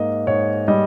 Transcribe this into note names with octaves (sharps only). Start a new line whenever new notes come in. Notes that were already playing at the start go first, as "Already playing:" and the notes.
Already playing: G#2 A#3 D#5
G#2 C#5
G3 D#5